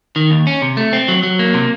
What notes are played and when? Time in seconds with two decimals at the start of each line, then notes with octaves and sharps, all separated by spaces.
0.16 D#3
0.31 D#2
0.47 C#4
0.62 C3
0.77 A3
0.93 C4
1.08 F#3
1.23 F#3
1.39 A#3
1.54 C3